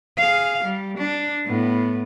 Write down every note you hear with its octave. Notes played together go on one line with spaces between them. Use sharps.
G#4 F5
G3
D4
A2 B3